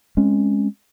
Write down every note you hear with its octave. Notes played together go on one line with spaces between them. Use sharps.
G#3 C4 C#4